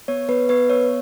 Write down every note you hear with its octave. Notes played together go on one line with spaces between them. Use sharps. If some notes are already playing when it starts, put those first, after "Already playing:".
B3 C#5
B3 B4
B3 B4
B3 C#5